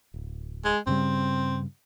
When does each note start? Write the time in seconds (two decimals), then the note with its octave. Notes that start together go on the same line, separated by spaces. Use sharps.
0.14 D1
0.65 G#3
0.87 G2 C#3 G3 C4